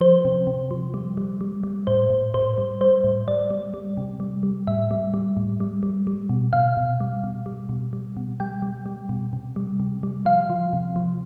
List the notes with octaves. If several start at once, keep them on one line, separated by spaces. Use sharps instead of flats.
F3 C5
C3
C3
F3
G3
G3
G3
G3
A2 C5
A2
A2 C5
G3
G3 C5
A2
G3 D5
G3
G3
C3
G3
G3
A2 E5
G3
G3
A2
G3
G3
G3
B2
B2 F5
B2
G3
B2
G3
B2
G3
B2
G3 G5
G3
G3
B2
C3
G3
C3
G3
F3 F5
F3
C3
F3